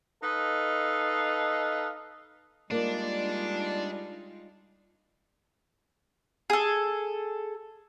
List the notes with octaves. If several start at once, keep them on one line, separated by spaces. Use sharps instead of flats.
D#4 A4 B4 D#5 F5
G3 G#3 A#3 D4 D#4 F4 D5
G#4 A4